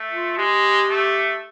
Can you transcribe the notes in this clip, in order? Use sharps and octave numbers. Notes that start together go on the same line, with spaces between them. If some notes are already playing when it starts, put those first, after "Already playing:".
Already playing: A3
F4
G#3 G4
A3